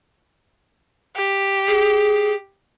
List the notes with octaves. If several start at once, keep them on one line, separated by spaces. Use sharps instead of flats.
G4
G#4